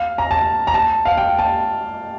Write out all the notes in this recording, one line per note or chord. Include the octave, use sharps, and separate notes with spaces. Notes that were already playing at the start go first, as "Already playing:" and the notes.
Already playing: F5
A#5
A5
A#5
A5
F5
G5
A5